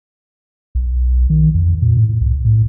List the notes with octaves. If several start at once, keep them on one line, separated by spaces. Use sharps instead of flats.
B1
D#3
F2
A#2
A2
C2
A2